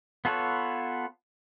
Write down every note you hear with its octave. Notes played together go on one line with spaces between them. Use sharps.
B3 F4 A4 B4 C#5